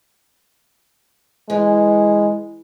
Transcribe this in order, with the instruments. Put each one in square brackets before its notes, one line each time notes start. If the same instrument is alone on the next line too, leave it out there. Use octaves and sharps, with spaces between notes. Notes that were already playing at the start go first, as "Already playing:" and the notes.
[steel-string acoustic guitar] E3 [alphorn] G#3